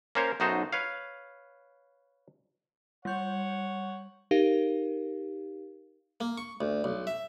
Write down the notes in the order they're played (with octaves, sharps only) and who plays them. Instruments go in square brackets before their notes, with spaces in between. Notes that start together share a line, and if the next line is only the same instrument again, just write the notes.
[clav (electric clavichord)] A#3 C#4 A#4 C5 C#5
B1 F#2 D#4 F#4 C5 A5
B4 C#5 F5
[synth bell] G3 G6 [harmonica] C#5 F#5
[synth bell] D#4 G4 A#4 F5
[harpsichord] A#3
C#6
D2
B1
E5